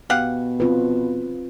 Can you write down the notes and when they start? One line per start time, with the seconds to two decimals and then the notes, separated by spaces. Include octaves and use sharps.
0.10 B2 G4 F5 F#5
0.60 C4 F4 B4